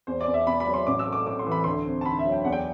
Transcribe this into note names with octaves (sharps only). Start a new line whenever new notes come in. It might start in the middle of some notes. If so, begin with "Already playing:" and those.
E2 C5
D5
E2
E5
B2 B5
B5
F#3
C6
A1 D6
E6
A3
D6
A2 D6
C6
E3
B5
D2 C6
C4
A5
D3 B5
E5
F#3
G5
E2 F#5
G5